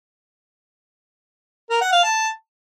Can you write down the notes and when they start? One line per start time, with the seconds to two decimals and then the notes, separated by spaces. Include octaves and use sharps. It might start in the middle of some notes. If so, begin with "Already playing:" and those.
1.70 A#4
1.81 F#5
1.92 F5
2.03 A5